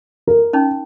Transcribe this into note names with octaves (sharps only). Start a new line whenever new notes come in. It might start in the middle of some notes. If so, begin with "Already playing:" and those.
A#4
C#4 D#4